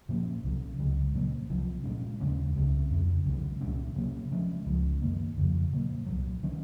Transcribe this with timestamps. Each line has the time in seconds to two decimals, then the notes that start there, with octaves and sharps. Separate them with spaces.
0.09 A#2 F3 A#3 C#4
0.43 C2 C3 F#3
0.79 C#2 C#3 G#3
1.14 A#2 F#3 A#3
1.50 C2 C3 F3 C4
1.84 A#2 G#3 C#4
2.20 D#2 C#3 G#3 C#4
2.55 C#2 C#3 G#3 C4
2.90 F2 C#3 F#3
3.25 C2 C3 D#3 G#3
3.61 C2 A#2 F#3 C#4
3.96 C3 F#3 A#3 C#4
4.31 C3 F3 G#3 C#4
4.66 C#2 C#3 F3 G#3
5.02 F#2 D#3 A#3
5.37 F2 C#3 F3
5.72 A#2 F#3 A#3
6.06 C2 A#2 F#3
6.43 D#3 F#3 C#4